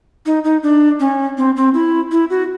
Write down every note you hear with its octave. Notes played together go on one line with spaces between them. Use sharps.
D#4
D#4
D4
C#4
C4
C4
E4
E4
F#4